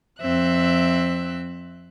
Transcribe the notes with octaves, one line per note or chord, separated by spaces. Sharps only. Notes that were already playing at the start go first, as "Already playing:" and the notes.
F2 C4 E5 F#6